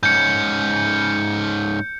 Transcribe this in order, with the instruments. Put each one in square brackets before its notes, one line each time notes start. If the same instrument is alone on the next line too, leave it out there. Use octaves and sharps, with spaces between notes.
[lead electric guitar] G#2 C#4 [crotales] G6 C#7